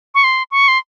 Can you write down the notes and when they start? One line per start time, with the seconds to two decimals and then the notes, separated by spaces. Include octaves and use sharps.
0.15 C#6
0.24 C6
0.51 C#6
0.68 C6